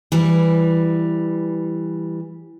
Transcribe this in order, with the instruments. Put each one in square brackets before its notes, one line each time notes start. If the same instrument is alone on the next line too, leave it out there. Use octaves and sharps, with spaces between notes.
[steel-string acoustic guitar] E3 G3